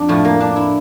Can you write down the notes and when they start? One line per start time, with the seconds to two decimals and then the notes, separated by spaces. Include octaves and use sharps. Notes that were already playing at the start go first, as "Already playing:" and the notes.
Already playing: F2 D4
0.09 A2 F3 A3
0.25 A#3
0.40 D4
0.56 E4